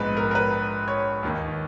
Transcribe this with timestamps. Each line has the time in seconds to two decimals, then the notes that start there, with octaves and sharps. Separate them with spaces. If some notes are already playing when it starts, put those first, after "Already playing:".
Already playing: A#1 G#2 F3 G#3 B3 B4
0.17 A#4
0.31 A#4
0.35 B4
0.88 C#5
1.23 D#2 D#3 A#3